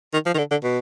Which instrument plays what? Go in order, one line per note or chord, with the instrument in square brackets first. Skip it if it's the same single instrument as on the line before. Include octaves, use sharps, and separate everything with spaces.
[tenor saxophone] D#3
F3
D#3
D3
D3
B2